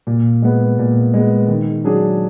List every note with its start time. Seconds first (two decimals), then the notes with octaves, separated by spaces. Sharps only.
0.07 A#2
0.42 G#3 B3
0.79 A#2
1.14 G#3 B3
1.48 D#3
1.84 F#3 D4 G#4